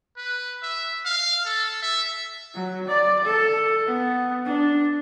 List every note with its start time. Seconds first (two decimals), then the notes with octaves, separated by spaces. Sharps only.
0.17 B4
0.62 E5
1.05 F5
1.46 A4
1.82 E5
2.54 F#3
2.88 D5
3.24 A4
3.86 B3
4.45 D4